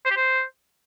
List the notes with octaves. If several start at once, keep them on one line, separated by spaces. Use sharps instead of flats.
C5
G4
C5